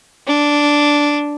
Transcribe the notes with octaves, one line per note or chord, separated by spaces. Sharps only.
D4